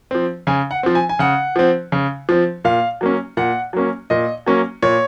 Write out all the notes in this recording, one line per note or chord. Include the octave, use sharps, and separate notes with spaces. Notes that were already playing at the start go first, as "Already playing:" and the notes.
F3 C4
C#3 G#5
F#5
F3 C4
G#5
G#5
C#3 F#5
F3 C4
C#3
F3 C4
A#2 F5
F#3 A#3 C#4
A#2 F#5
F#3 A#3 C#4
A#2 D#5
F#3 A#3 C#4
A#2 C#5